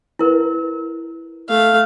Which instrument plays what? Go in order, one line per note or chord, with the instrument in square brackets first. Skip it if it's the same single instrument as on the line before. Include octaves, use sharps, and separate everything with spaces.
[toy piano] E4 A#4 B4
[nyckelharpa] A3 F5